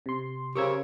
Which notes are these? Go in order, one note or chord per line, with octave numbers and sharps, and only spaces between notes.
C3 C6
C#3 G4 A#4 C5 C#6 E6 G#6